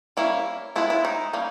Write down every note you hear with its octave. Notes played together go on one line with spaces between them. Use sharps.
G3 A#3 C#4 E4
F3 G#3 B3 E4
E4
D#4
G3 A#3 C#4